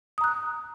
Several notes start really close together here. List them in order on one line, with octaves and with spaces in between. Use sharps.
D#6 A#5 F#6